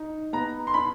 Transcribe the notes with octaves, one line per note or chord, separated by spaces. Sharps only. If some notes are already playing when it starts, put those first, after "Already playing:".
Already playing: D#4
B3 A#5
C6
D4 B5